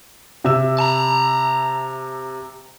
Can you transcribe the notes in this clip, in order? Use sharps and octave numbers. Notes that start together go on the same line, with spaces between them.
C3 E5 E6
A5 A#5